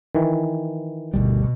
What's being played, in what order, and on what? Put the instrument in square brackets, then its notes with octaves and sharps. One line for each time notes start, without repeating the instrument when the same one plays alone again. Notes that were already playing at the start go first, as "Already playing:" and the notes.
[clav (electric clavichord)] D#3 E3
[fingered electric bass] G1 D2 G3 [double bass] B2